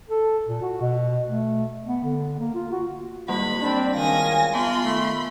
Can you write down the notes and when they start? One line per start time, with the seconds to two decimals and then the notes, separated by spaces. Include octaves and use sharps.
0.09 A4
0.48 A#2
0.62 F#4
0.81 B2
1.27 A3
1.87 B3
2.04 D3
2.39 A#3
2.55 F4
2.72 F#4
3.28 G#1 G3 A#3 E4 F#4 F#5 B5
3.61 C4 D4
3.95 C#2 D#3 F#3 F5 G#5 A#6
4.54 B3 F4 F5 A5 B5 C6
4.84 D#3 A3